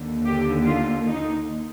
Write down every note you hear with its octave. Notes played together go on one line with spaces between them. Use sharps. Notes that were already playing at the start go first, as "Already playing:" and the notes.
Already playing: D#2 D3
G4
F4
D#4